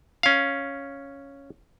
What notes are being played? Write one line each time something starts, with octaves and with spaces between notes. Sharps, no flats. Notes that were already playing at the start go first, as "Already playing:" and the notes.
C#4 F5